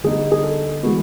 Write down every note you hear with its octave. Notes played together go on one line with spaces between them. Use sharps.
D3 G3 B3 D#4 G#4
G#4
A4
E3 G#3 B3 F#4